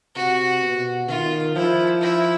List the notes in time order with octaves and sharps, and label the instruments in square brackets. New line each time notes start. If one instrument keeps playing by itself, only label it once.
[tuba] C3 [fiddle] F#4
[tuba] B2
[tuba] D#3 [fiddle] F4
[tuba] F3 [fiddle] E4
[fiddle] E4